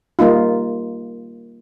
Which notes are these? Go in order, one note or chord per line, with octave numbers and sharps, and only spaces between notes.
G3 A#3 D#4 F4